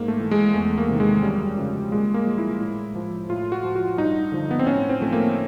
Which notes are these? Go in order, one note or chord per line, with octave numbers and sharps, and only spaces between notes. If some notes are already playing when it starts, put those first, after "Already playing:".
Already playing: G#2 A#3
A3
E3
G#3
E2 A3
A#3
C3 D#3
G#3
F#2 G3
C#3 F3
A#2 G#3
A#3
F3
E4
A2
F3
A2 F4
F#4
F3
F#4
G2 D#4
D3 F3
B3
C4
A2 C#4
C4
F3 A3
A#3